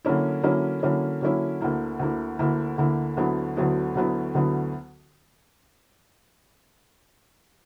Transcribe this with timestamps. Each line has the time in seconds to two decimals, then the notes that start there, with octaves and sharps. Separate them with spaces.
0.05 D3 F#3 A#3 C#4 E4
0.43 D3 F#3 A#3 C#4 E4
0.83 D3 F#3 A#3 C#4 E4
1.22 D3 F#3 A#3 C#4 E4
1.61 D2 D3 A#3 E4
1.99 D2 D3 A#3 E4
2.39 D2 D3 A#3 E4
2.78 D2 D3 A#3 E4
3.17 D2 D3 F#3 B3 E4
3.57 D2 D3 F#3 B3 E4
3.95 D2 D3 F#3 B3 E4
4.34 D2 D3 F#3 B3 E4